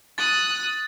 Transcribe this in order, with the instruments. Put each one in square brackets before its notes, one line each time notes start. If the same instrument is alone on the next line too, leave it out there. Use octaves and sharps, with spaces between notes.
[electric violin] D#6 F#6 [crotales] A6